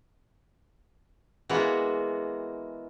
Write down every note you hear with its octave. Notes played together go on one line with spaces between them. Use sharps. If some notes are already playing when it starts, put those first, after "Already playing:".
E3 G#3 A#3 B3 F#4